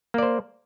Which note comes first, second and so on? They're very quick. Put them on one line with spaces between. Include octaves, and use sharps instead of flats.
A#3 D5 C5